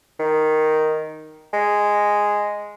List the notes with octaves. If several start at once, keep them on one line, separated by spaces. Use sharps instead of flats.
D#3
G#3